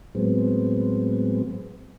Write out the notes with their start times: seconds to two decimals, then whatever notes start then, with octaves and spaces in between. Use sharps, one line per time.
0.15 A2 F#3 G#3 B3 C4